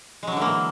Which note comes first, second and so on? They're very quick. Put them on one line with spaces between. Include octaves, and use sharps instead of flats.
G#3 F#3 D3 E3 A#3